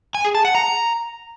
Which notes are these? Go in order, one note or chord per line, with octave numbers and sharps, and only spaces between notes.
G#5
G#4
A5
F#5
A#5